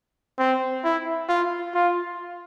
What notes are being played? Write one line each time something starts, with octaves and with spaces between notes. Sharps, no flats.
C4
E4
F4
F4